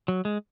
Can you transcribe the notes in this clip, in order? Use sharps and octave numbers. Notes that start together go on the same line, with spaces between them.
F#3
G#3